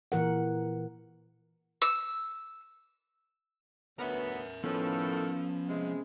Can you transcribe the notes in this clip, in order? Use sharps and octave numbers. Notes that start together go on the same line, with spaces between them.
A#2 E3 A#4 F#5
E6
D2 F#3 B3 A#4 E5
A2 D#3 F3 B3 C#4 A4 B4
C3 G#3